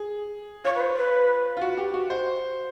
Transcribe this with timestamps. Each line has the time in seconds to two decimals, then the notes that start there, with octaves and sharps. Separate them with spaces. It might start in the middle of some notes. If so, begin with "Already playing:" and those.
Already playing: G#4
0.64 F4 C#5
0.75 B4
0.80 C5
0.96 B4
1.57 F4
1.61 F#4
1.77 G4
1.94 F#4
2.10 C5